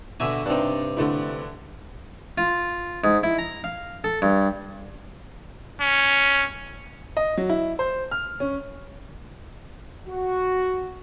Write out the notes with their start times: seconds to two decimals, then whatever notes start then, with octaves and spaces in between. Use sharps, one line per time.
0.20 B2 D3 E5 G#5
0.46 G2 C3 D4 D#4
0.97 D3 A3 E4
2.38 F4
3.04 G#2
3.23 E4
3.39 A#5
3.64 F5
4.04 A4
4.22 G2
5.81 C#4
7.17 D#5
7.37 F#3
7.50 E4
7.79 C5
8.11 F6
8.40 C#4
10.08 F#4